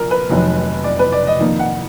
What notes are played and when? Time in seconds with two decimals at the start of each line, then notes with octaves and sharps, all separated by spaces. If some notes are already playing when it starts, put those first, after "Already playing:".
Already playing: A#1 A#2 A#4
0.11 B4
0.29 F1 F2 D#3 F#3
0.84 D5
0.99 B4
1.12 D5
1.27 D#5
1.40 F2 D#3 A#3 D#4
1.59 F#5